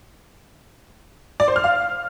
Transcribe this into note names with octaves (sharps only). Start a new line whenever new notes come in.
D5
C5
F6
F5